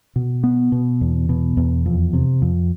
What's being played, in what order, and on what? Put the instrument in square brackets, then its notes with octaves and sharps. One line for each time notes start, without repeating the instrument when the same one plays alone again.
[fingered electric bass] B2
B3
B2
E2
B2
E2
F2
C3
F2